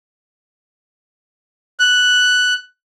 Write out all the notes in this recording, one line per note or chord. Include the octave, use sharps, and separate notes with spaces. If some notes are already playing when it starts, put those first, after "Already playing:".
F#6